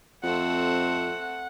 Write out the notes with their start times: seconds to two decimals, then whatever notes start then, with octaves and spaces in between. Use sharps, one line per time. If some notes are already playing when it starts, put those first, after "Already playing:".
0.24 F2 A3 C4 F#5